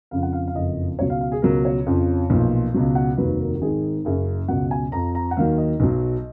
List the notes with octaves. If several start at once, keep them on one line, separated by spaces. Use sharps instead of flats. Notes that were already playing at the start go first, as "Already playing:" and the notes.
F2 C#3 F3 F5
F#5
F5
F5
F#1 F2 F3 D#5
C#2 B2 F#3 C#5
F5
F5
G#4
C#2 B2 F#3 A#4
C#5
F2 C#3 F3
B1 A#2 F3
C#2 B2 F#3
F#5
F1 D#2 D#3 F#3 B4
A#4
F#4
G#1 G#2 D#3 G#4
F#1 F#2 C#3 G#4
C#2 B2 F#3 F#5
G#5
F2 F3 A#5
A#5
F#5
D#2 D#3 F#3 F5
D#5
B1 B2 F#3